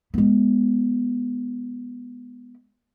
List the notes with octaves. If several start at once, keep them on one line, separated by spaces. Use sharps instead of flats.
G#3 B3